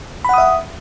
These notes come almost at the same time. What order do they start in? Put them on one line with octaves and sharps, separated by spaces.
B5 F#5 D#6 E5